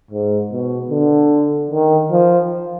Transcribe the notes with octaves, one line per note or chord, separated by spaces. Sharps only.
G#2
B2
D3
D#3
F3